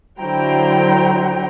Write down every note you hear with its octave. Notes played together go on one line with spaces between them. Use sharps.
D3 F#3 E4 C5 G5 A#5